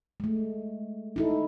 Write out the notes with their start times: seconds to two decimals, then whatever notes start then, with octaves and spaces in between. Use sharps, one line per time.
0.20 G#3 A3
1.16 D#4 E4 A4